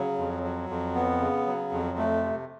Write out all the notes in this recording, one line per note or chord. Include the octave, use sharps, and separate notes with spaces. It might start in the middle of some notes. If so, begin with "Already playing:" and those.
Already playing: C#3 F#3
F2
F#3
F2
B3
C#3
F#3
F2
A3
C3